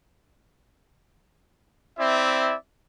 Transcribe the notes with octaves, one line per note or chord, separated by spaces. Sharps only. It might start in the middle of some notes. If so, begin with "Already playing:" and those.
C4 E4 D5 E5